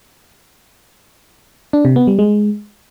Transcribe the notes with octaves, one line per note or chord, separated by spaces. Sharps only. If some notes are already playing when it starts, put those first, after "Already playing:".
D4
C3
B3
G3
G#3